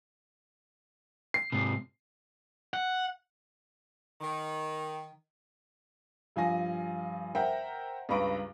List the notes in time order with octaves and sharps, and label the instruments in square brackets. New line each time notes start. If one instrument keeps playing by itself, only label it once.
[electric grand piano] C7
[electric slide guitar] G#2 C3
[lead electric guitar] F#5
[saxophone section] D#3
[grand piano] G2 F3 F5 G#5 A#6
A#4 C5 E5 F#5 G5 A#5
C#2 G2 B4 A#5 C#6 D7